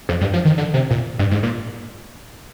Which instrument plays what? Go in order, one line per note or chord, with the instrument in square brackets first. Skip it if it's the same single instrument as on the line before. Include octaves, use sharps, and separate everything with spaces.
[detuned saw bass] F2
G2
F3
D#3
D3
C3
A#2
G2
G#2
A#2